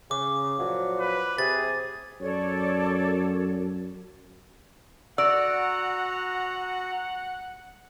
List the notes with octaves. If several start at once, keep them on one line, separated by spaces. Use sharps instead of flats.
C#3 D6
A#2 F3 F#3
B4
C3 G#4 A6
F#2 A4 C#5 D5
F#4 D5 F#5 A#5 E6